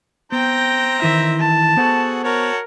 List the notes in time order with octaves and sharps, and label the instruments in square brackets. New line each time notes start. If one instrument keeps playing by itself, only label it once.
[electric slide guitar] B3 [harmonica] C4 C5 A#5 [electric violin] G5
[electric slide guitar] D#3 E3 E4 [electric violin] E5
[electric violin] A5
[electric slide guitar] B3 C5 F#5 [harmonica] F#4 G#4 A4
[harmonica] F#4 C#5 A5 [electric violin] A#4